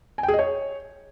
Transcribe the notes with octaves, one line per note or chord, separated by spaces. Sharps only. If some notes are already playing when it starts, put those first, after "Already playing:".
G#5
G5
G#4
D#5
C#5